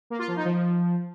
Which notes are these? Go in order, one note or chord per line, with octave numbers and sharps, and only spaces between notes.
A#3
F4
F3
D#4
F3